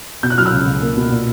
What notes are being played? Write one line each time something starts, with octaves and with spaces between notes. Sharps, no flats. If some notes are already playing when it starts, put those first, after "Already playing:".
B2 G6
F#6
F#3 F6
E6 F#6
C#2
C#2
A#3
B2
A#2